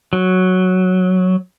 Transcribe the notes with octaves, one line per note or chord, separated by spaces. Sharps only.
F#3